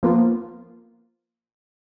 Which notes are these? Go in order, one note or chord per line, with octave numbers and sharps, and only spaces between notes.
F3 A#3 B3 F4